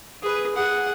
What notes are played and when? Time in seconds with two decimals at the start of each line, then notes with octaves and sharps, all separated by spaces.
0.22 G#4 B4
0.55 G#4 F#5